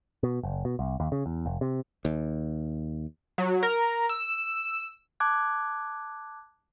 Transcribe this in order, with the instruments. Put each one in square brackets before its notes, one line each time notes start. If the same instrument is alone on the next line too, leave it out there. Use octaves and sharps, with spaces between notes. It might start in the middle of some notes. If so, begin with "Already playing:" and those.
[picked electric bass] B2
F#1
B2
C2
D#2
C#3
E2
F1
C3
[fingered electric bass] D#2
[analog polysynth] F#3
A#4
E6
[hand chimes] A5 D6 F#6 G#6